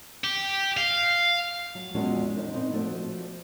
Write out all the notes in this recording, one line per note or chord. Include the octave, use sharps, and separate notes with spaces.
G4
F5
F#3
E2 A#2 F3 G#3 C#4 F#4
C#4 D#4 C5
A#2 C4 D#4 B4
F3 A3 F#4 C5 D5